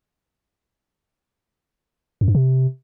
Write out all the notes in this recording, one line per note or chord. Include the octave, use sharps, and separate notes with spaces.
F#2
G2
C3